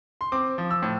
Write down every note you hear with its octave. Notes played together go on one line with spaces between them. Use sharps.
C6
C4 D6
F3
E6
A2